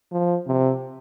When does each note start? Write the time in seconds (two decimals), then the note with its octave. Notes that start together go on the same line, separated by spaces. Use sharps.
0.12 F3
0.47 C3